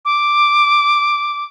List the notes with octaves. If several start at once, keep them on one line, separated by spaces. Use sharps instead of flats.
D6